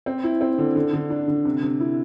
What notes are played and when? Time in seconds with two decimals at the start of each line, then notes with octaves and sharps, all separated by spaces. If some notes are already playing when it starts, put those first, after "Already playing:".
0.06 C4
0.24 E4
0.41 C4
0.58 D3
0.76 D3
0.93 D3
1.10 D4
1.28 D3
1.45 C3
1.63 C3
1.80 E4